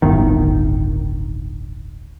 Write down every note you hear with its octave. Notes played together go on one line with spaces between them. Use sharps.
D1 G1 D#3